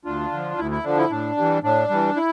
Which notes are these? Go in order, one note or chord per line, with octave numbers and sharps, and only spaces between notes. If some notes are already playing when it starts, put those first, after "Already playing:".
D2 D4 F4
D3 F3
D2 E4
E4
D3 F3 D4
E4
A2 D4
E3 G3
A2 D4
E3 G3
E4